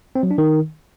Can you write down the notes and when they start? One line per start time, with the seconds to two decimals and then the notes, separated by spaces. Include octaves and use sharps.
0.15 C4
0.23 F#3
0.31 D4
0.38 D#3